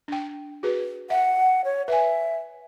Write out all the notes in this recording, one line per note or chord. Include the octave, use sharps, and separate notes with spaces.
D4 G5
F#4 G#4 B4
E5 F#5
C#5
B4 E5 G#5